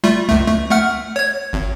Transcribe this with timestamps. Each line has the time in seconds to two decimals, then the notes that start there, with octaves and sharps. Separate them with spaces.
0.04 G3 A3 F4
0.29 C#2 A3
0.48 A3
0.71 A3 F#5 F6
1.16 C#5 G#6
1.53 G#1